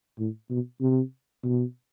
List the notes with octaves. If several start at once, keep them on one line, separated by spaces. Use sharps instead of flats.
A2
B2
C3
B2